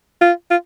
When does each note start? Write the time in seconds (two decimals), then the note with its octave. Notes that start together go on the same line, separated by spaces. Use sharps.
0.21 F4
0.51 F4